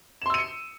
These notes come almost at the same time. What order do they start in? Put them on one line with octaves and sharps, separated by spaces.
E7 C6 E6 D#7 C#7